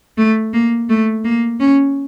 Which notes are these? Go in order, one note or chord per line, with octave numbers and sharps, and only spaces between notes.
A3
A#3
A3
A#3
C#4